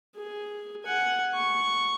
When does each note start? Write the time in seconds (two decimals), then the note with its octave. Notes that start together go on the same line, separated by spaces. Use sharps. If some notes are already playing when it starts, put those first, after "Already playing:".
0.16 G#4
0.84 F#5 G#5
1.34 C#6